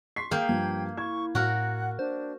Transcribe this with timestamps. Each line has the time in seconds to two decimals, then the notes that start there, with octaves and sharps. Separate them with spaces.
0.16 C6 C#6 B6 C7
0.31 A#3 G#4 G5 G6
0.49 G2 F3 G#6
0.97 E4 C#6 G#6
1.35 A2 F#4 A#4 F#5
1.99 D4 C5